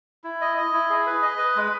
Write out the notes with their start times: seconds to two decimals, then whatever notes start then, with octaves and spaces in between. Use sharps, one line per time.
0.24 E4
0.41 D#5
0.57 D#5
0.73 E4
0.90 G#4
1.07 B4
1.22 D#5
1.38 B4
1.56 G#3